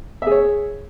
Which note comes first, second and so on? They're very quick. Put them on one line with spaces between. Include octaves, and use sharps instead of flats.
E5 G#4 C#5